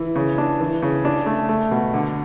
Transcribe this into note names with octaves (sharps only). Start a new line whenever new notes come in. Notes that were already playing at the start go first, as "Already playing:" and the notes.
Already playing: E3
C#3
D4
E3
C#3
D4
A3
A3
B2
D3